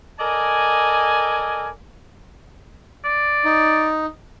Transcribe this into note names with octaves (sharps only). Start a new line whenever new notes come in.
A4 A#4 D5 D#5 G#5
D5
D#4